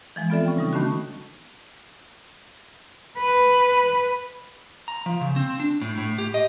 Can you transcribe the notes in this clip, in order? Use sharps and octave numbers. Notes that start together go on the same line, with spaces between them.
E3 F3 G#3
B3 C4 F4 A4 D5 E5
C#4 G5
C#3 G3 D#4
D#3 A3 B3 C#4 D4 F#4
B4
A#5
F3
C#3
C4
D4
A2
A2
G4
D#5